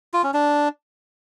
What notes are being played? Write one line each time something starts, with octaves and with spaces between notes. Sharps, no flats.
F4
C#4
D4